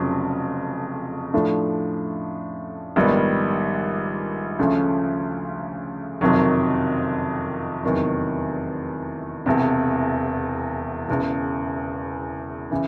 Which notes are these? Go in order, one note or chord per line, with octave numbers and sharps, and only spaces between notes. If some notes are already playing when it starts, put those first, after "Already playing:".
Already playing: F1 F2 C#3 F#3
A2 F3 A3 D4
A#1 G#2 D#3 G3 B3
D2 C#3 F3 A3 C#4
F#1 F2 C3 D#3 F#3
F1 E2 C3 D#3 F#3
E1 E2 C3
E1 E2 C#3
C#3 E3